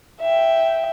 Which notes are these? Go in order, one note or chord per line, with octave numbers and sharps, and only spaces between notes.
E5 G5